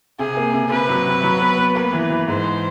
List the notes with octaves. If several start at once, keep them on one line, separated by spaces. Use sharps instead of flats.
C3 G#4
A#3
C3
C3 B4
F#3
C3
F#3
B3
B3
A#3 B4
E3
E3
G#2 C5